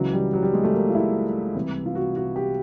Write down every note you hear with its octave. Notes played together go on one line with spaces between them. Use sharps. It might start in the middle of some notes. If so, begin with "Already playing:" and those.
Already playing: C#2 C#3 E3 F#3
G3
F#3
G3
G#3
A3
A#3
F4
E4
C2 C3 E3
F4
F#4
F#4
G4